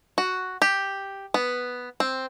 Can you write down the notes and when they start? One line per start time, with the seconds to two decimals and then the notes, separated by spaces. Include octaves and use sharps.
0.18 F#4
0.62 G4
1.34 B3
2.00 C4